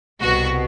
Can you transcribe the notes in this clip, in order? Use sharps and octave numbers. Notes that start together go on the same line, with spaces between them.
C2 B2 F#4